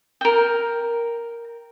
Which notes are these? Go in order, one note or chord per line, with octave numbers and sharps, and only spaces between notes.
A#4 G5